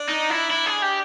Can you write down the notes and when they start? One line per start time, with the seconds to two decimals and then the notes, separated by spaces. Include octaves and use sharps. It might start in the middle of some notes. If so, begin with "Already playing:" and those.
Already playing: D4
0.09 D#4
0.30 E4
0.50 E4
0.66 G#4
0.82 G4